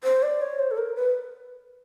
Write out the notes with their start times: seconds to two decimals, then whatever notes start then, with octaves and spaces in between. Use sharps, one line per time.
0.04 C5
0.23 D5
0.42 C#5
0.59 C5
0.71 A4
0.78 A#4
0.96 B4